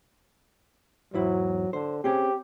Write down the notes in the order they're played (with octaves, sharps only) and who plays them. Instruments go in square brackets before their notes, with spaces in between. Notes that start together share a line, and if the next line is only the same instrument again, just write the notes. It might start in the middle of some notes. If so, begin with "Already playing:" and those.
[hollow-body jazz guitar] E2 G#2 E4 [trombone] F#3
[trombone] D3 [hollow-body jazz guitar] C5
[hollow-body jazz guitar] C4 C#4 G#4 [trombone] G4